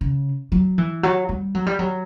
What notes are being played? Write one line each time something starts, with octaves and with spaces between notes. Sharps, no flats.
C#3
F#3
E3
F#3
G3
F#3
G3
F#3